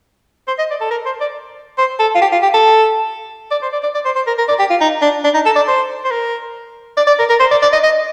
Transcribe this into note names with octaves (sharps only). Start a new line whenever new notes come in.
C5
D#5
D5
A4
A#4
C5
D5
C5
A4
F4
G4
F4
G4
A4
D5
C5
D5
D5
D5
C5
C5
A#4
A#4
D5
G4
F4
D#4
D4
D4
D#4
A4
D5
C5
C5
A#4
D5
D5
A#4
A#4
C5
D5
D5
D#5
D#5